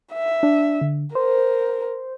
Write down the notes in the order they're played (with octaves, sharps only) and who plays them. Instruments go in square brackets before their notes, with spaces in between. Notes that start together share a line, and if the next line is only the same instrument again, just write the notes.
[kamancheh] E5
[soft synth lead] D4
D3
[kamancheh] A#4 [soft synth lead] C5